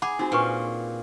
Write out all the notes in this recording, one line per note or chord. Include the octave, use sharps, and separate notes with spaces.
G#4 F#5 B5 D6
C4 D#4 F#4 B5
A#2 D4 B4 C#6